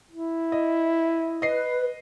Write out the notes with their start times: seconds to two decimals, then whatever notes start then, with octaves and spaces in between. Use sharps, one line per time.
0.11 E4
0.52 D#5
1.42 B4 D#5 C7